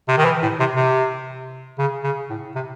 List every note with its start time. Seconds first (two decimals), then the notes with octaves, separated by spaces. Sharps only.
0.08 C3
0.18 D#3
0.25 E3
0.42 A2
0.60 C3
0.76 C3
1.79 C#3
2.04 C#3
2.30 A2
2.56 C3